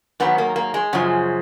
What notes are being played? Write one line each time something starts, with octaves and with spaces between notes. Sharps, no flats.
G#2 D#3 F#3 B3
A#3
A#3
G#3
F#2 C#3 F3